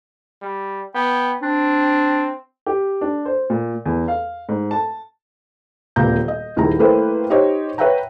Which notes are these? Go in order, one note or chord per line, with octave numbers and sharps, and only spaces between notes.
G3
B3 G5
C4 D4
G4
D4
C5
A#2
E2
F5
G#2
A5
D#1 D2 A#2 B3 A#5 G6
D#5
D#1 D#3 E4 G#4 A#5
A3 A#3 E4 B4 C5 G5
D#4 G4 C5 C#5 D#5
B4 C#5 E5 F#5 G5 A#5